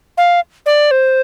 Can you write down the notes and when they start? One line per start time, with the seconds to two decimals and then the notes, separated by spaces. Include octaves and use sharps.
0.18 F5
0.66 D5
0.91 C5